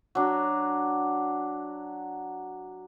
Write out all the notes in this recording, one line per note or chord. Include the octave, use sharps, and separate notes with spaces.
F#3 D4